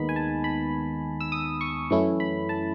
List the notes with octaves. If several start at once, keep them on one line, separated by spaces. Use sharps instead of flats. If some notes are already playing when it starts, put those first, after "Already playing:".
Already playing: D#2 D#3 G#3 B3 D#4 B5
G#5
A5
B5
E6
D#6
C#6
F#2 E3 A3 C#4 E4 C#6
B5
A5